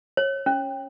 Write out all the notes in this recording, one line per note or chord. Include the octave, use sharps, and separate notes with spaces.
C#5
C#4